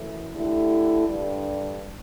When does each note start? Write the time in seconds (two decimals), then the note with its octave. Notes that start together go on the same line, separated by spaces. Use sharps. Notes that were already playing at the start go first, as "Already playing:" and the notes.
Already playing: F#2 E3 A3 E4
0.33 D3 A3 E4 G4
1.07 G2 D3 G3